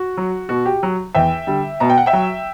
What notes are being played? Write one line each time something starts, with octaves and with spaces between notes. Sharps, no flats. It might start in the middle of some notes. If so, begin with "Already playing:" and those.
Already playing: F#4
F#3
B2 F#4
G4
F#3
E2 E5 G5
D3 G3
B2 A#5
G5
F#5
E5 G5
F#3